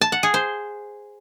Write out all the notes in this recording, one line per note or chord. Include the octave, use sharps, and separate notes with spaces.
A5
F#5
G#4
C5